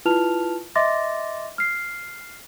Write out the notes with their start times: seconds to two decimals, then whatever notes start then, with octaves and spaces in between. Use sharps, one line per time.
0.05 E4 F4 B4 A5 F6 F7
0.75 D#5 E5 C6 D6 A6 A#6
1.58 F6 C7